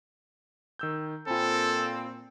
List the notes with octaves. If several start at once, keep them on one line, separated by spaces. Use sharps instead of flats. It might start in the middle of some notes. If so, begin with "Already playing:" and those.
D#3 E6 G6
A#2 C4 F4 A4 G#5 B5